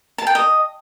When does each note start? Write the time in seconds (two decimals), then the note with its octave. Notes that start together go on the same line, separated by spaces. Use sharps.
0.18 A5
0.27 G5
0.35 D#5